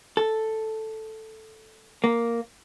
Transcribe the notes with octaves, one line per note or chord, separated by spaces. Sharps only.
A4
A#3